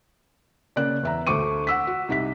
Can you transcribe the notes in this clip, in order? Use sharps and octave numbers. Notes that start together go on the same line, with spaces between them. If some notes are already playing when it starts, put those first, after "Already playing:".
C#3 A#3 D5 F#6
E2 E5 A#5
D2 A3 C5 C#6 D6 D#7
F#5 E6 B6
F#4
C2 D#4 E5 B6